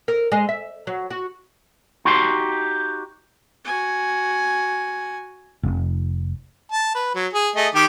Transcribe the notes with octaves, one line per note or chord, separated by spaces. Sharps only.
A#4
G#3
E5
F#3
F#4
D#4 F#4 G4 C6
F#4 G#5
F1
A5
B4
F#3
G#4
A3 G#4 D#5
D#3 G4 D6